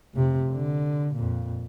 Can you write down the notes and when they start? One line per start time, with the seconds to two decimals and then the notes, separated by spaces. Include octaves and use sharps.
0.14 F1 C3
0.52 D3
1.15 F2 A#2